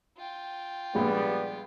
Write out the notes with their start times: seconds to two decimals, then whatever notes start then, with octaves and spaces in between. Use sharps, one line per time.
0.17 F4 G5
0.95 A#1 G3 G#3 B3